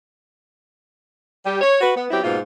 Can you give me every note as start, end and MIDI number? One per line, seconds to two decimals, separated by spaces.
1.45 1.60 55
1.45 1.60 67
1.62 1.78 73
1.81 1.93 66
1.81 1.93 71
1.96 2.06 59
2.11 2.19 54
2.11 2.19 59
2.11 2.19 60
2.11 2.19 64
2.11 2.19 67
2.23 2.38 44
2.23 2.38 47
2.23 2.38 58
2.23 2.38 65